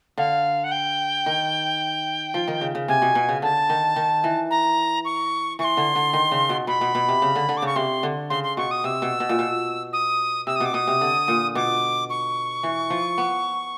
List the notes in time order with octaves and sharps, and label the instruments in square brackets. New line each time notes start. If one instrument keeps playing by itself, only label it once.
[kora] D3 [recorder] F5
[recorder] F#5
G5
[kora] D#3
F3
D#3
C#3
C#3
[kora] C3 [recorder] G#5
[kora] B2
B2
C#3
[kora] D3 [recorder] A5
[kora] D#3
D#3
E3
[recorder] A#5
C#6
[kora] E3 [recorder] C#6
[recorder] C6
[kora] D3
D3
D#3
C#3
B2
[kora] B2 [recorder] B5
[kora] B2
B2
C3
C#3
D3
D3
[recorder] D6
[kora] C#3 [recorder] C#6
[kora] C3 [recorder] C6
[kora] D3
[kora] C#3 [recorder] C6
[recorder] C6
[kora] B2 [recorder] C#6
[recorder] D#6
[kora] C3 [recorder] E6
[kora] B2
B2
A#2
B2
[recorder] D#6
[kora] C3 [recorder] E6
[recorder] D#6
[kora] B2 [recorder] D6
[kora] B2 [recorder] D#6
[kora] C3
D3
A#2
[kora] B2 [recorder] D6
[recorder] C#6
[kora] E3
F3
B3